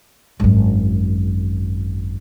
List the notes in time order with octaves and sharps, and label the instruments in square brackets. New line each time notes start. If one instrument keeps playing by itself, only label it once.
[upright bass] G#1 F#2